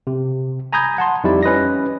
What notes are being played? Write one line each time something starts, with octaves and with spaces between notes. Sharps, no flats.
C3
G#5 A#5 B5 D#6 G6 G#6
F#5 A5 C6
F2 G3 D#4 E4 G4 D5
C#4 B4 D#5 A#6